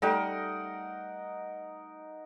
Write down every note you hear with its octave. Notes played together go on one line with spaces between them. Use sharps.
G3 A3 D#4 A#4 F#5